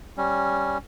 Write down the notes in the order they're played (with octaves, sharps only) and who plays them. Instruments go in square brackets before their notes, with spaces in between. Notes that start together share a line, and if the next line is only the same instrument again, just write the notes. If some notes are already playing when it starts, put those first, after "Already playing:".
[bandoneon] G3 C#4